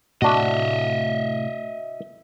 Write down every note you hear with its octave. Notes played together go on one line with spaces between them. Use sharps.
A2 C3 A3 D4 F#4 D#5 E5